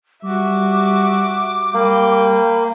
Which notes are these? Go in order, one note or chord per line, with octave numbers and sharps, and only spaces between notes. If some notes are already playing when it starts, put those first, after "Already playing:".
G3 F#4 E5 D6
G3 A#3 G5 B5